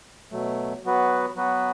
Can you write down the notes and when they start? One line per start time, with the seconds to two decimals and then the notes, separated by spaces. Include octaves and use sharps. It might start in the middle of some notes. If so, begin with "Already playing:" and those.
0.31 B2 F#3 A3
0.84 F#3 B3 F#4 B4
1.35 F#3 B3 F#4 B4